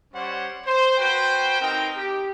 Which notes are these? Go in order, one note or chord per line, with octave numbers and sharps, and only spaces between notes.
G3 C#4 C5 C#5 F#5
C5
F#4 B4 C5 G5
C4 D#4 A#4 G5
G4